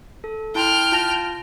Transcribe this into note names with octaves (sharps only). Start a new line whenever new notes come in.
A4
E4 G5 A5 C6 F6
F4 A5 A#6